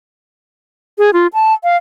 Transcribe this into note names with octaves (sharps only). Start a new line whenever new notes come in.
G#4
F4
A5
F5